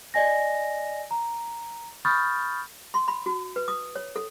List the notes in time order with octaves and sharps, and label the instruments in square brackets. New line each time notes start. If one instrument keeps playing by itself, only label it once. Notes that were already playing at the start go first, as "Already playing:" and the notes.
[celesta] D5 D#5 G#5 A#6
A#5
B5 C#6 D#6 F6 G6 A6
[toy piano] C6
B5
F#4
B4
D#6
C#5
A4